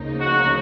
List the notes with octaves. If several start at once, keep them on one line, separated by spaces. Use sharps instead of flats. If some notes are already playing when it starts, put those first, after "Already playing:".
Already playing: D2 C#3 F3 A#3 D#4
F#4